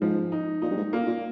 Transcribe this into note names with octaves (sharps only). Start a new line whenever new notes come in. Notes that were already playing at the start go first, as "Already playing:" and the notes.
G#2 F3
D#4
A#2 D#4
G2
G#2
A#2 A#3
A#2